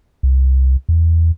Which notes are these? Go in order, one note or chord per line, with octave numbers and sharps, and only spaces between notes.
C2
E2